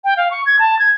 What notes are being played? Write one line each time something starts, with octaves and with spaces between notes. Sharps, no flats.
G5
F5
C#6
G#6
A5
G#6